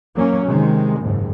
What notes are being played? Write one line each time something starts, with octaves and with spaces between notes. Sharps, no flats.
F#3 A#3 C#4
C3 D#3 G#3
F#1 D#2 G#2